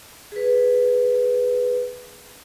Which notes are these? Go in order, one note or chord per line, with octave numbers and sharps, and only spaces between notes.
G#4 B4